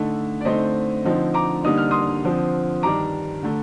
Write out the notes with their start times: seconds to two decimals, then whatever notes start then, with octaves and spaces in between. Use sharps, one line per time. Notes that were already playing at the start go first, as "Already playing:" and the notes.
Already playing: D3 A3 D#4
0.41 D5
0.45 D3 A3 C4 D#4 C5 D#5
1.05 D3 F3 C4 D#4
1.34 A#5 D6
1.64 D3 G3 A#3 D#4 D#6
1.78 F6
1.91 C6 D#6
2.23 D3 F3 C4
2.83 G2 D#3 G3 D4 A#5 D6
3.43 D3 A3